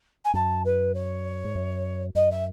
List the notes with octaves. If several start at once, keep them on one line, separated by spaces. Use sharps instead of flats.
G#5
F#2 A5
B4
C#5
G#2
F#2
F#2 D#5
E5